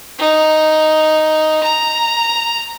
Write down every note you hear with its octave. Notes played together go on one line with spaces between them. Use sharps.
D#4
A#5